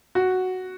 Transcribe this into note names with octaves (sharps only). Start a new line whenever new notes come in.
F#4